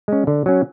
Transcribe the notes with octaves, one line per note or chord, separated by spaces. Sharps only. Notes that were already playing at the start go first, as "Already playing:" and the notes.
G#3 C#4
D3
F#3 C#4